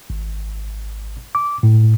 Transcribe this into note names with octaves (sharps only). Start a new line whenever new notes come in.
G#1
D6
A2